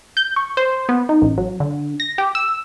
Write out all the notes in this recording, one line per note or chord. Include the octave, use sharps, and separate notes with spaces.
G6
C#6
C5
B3
D#4
A1
F#3
D3
A#6
G4
E6